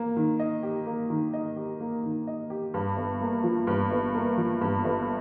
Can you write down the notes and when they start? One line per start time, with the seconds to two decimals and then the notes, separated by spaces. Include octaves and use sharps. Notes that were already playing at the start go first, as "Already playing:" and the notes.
Already playing: A#3
0.17 D#3
0.40 D#5
0.63 G4
0.87 A#3
1.10 D#3
1.33 D#5
1.56 G4
1.80 A#3
2.03 D#3
2.27 D#5
2.50 G4
2.74 G2
2.97 G1
3.21 A#3
3.44 F3
3.67 G2
3.91 G1
4.15 A#3
4.38 F3
4.61 G2
4.84 G1